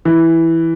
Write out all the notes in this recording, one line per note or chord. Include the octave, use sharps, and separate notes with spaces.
E3